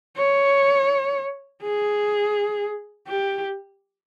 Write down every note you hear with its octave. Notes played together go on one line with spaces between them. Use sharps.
C#5
G#4
G4